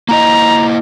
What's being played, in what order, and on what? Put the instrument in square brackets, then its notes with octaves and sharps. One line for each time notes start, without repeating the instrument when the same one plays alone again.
[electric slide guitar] A#3 E4 D#5 [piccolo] A#5